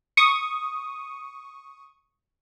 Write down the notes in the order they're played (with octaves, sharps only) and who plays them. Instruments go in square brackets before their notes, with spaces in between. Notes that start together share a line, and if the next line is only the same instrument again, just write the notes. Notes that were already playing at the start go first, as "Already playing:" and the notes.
[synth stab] C#6 D#6